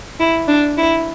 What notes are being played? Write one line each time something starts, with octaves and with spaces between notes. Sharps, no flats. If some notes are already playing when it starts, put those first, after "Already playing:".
E4
D4
E4